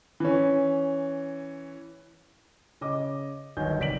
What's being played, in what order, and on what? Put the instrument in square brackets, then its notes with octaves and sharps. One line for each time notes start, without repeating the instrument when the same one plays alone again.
[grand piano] E3 C#4
C#3 D#5 D6
G1 D#2 F#3 D#5 G#5 G6
F1 D5 B6 D7 F#7